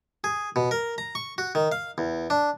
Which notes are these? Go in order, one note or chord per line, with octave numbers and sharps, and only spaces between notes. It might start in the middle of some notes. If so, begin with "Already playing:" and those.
G#4
B2
A#4
A#5
C#6
F#4
D#3
F5
E2
D4